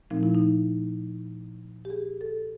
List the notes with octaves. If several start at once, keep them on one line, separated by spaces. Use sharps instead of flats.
A#2 F3 A3 C4 D#4
E4
D#4
G4
G#4
A4